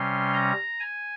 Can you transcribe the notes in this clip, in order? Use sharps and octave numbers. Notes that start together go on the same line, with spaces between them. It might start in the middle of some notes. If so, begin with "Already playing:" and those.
Already playing: C3 G3 C#4 C6
A#5
G#5